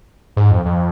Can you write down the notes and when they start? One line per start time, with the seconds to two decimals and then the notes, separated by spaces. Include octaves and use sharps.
0.37 G#2
0.51 F2
0.65 F2